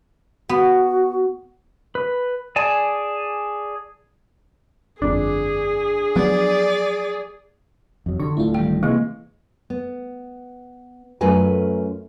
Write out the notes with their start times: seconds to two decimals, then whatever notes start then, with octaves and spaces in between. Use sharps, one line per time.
0.49 B3 F#4
1.95 B4
2.56 G#4 D5 G#5 A5
5.02 G1 F2 D4 G#4
6.16 F3 F#3 B3 D5
8.06 F2 F#3
8.19 D3 G4 C#6
8.37 D1 A3 D4 E4 F4
8.54 D#3 G3 F4 G5
8.83 C3 E3 G#3 A#3 C#6
9.70 B3
11.21 F#2 A3 F4 A#4 B4 G#5